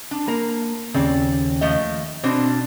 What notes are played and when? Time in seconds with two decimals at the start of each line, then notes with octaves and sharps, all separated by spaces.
0.11 D4
0.28 A#3 A#5
0.94 D#2 C#3 C4 D5
1.61 F3 A3 D#5
2.24 B2 C4 D4